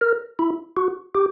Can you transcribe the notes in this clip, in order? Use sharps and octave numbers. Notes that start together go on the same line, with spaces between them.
A#4
E4
F#4
G4